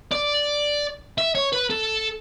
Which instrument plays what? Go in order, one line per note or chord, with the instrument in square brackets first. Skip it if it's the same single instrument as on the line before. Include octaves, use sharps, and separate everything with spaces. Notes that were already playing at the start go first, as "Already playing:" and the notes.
[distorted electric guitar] D5
E5
C#5
B4
A4